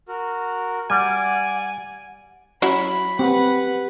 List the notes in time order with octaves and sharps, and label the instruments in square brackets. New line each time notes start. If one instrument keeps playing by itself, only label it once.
[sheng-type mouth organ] F#4 A#4
[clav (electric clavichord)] G3 [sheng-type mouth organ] D5 [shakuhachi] F#5 [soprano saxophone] G#5
[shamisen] F#3 C#4 E4 [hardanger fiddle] B5
[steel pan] C4 [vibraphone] G4 [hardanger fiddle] B4 F#5